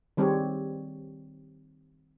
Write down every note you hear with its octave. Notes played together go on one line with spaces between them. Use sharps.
D#3 G3 C4 G4 G#4 C#5